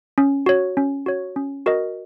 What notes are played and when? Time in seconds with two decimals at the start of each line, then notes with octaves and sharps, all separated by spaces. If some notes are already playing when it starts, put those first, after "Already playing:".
0.18 C#4
0.46 F#4 C#5
0.77 C#4
1.06 F#4 C#5
1.36 C#4
1.66 F#4 A#4 D#5